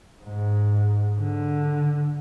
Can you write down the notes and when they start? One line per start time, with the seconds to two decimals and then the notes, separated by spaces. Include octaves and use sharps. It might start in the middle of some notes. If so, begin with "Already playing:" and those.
0.22 G#2
1.20 D3